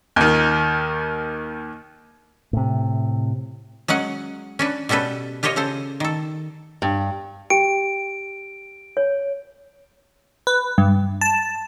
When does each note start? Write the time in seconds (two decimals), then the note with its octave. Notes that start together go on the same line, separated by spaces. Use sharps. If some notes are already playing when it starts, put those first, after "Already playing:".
0.16 D#2 D#3
2.53 A2 C3
3.88 F#3 G#3 C#4 F#5
4.59 C#4 D4 B4
4.89 B2 G3 C#4 A4 B4
5.43 F4 G4 C5 C#5 D#5
5.56 C#3 A4 C5
6.00 D#3 A4
6.82 G2
7.50 G4 G5 D7
8.97 C#5
10.47 B4
10.78 G2
11.21 A5